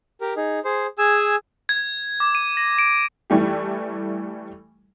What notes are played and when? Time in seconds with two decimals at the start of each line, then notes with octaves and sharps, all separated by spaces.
0.21 G4 A#4
0.36 D#4 G#4
0.65 G#4 C5
0.98 G#4 G#5 E6
1.69 G#6
2.20 D6
2.35 D#7
2.57 A#6
2.79 D7
3.30 E3 G3 A3 G4